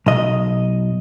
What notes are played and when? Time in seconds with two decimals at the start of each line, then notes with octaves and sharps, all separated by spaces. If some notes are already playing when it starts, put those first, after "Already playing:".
0.06 B1 D#5